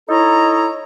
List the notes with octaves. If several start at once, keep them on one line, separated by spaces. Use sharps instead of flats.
D#4 E4 A4 C#5 D#5 A#5